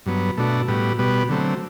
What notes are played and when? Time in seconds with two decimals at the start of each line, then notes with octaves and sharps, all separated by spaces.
0.06 G2 F#3 B3
0.37 B2 A3 D4 F#4
0.68 A2 G3 B3 F#4
0.99 B2 G3 B3 F#4
1.29 D3 F#3 A3 C4